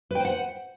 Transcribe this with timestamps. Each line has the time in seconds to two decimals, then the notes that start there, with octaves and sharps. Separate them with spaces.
0.11 B4
0.15 G5
0.20 C5
0.25 F#5